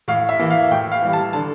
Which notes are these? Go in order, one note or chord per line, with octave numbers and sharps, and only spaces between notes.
A2 F5
E5
E3 A#3
F5
A2 G5
F5
E3 G3
A5
D3 A5